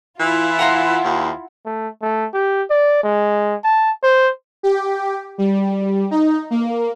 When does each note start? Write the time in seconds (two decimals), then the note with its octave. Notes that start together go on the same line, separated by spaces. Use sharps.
0.20 E3 E4 F4
0.59 F#5 A#5 C6
1.04 D#2
1.65 A3
2.02 A3
2.34 G4
2.70 D5
3.04 G#3
3.64 A5
4.03 C5
4.63 G4
5.38 G3
6.11 D#4
6.50 A#3